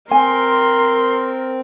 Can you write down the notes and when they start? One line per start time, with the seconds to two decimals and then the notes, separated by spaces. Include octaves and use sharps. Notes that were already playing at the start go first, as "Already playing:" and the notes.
0.11 C4 A#4 G#5 C6